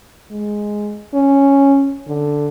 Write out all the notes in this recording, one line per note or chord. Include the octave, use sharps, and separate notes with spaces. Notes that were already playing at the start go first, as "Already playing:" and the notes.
G#3
C#4
D3